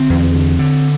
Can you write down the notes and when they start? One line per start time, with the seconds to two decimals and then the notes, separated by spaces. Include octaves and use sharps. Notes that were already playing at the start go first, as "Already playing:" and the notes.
Already playing: D3 C4
0.10 E2
0.34 D3
0.59 D3